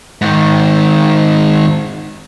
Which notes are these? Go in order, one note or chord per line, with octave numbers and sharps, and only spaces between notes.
G#2 D#3